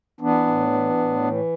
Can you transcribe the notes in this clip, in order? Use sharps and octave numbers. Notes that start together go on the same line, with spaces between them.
E3 B3 D4
A2
E3
A2
E3